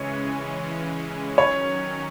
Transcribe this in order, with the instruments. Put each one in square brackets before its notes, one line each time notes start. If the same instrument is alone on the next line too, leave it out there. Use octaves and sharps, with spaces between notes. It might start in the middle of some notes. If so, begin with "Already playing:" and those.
Already playing: [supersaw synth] C#3 E3 G#3 C#4 [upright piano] C#5
[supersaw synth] D#3 F#3 C#4 [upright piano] C#5